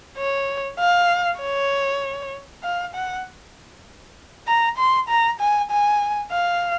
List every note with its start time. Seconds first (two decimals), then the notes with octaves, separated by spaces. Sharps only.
0.17 C#5
0.79 F5
1.40 C#5
2.63 F5
2.95 F#5
4.47 A#5
4.78 C6
5.09 A#5
5.40 G#5
5.71 G#5
6.31 F5